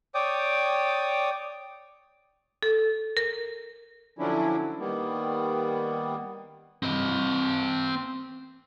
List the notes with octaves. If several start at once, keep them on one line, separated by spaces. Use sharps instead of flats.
C#5 D5 G5 D6 D#6
A4
A#4
D3 F3 F#3 C#4 D4 E4
D#3 G3 A#3 B3
C4 D#5